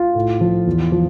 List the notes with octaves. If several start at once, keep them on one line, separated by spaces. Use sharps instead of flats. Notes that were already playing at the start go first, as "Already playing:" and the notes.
Already playing: F4
A2
F3
E2
F3